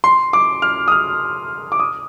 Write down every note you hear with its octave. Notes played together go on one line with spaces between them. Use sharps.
C6
D6
F6
D#6
F6
D6
D#6